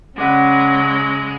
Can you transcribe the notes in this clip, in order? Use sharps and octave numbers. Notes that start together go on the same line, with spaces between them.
C#3 F#3 G#3 C#4 D5 F#5 B5